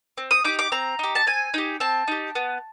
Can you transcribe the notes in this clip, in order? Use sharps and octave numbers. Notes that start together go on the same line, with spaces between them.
C4
D#6
D#4 G4 D6
D6
C4 A#5
D#4 G4
A5
C4 G#5
D#4 G4
C4 A5
D#4 G4
B3